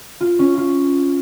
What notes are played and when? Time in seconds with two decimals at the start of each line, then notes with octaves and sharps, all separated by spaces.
0.21 F4
0.39 C#4
0.57 F4